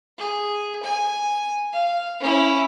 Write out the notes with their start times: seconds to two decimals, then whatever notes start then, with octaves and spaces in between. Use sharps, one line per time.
0.18 G#4
0.83 G#5
1.73 F5
2.20 C#4 E4